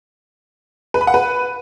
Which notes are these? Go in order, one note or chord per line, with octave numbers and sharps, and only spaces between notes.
B4
B5
F#5
B4